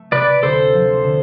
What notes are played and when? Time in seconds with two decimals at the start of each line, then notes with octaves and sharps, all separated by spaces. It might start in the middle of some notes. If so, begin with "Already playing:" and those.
Already playing: A3
0.12 C3 B4 D5
0.43 D2 A4 C5
0.74 F3
1.04 D3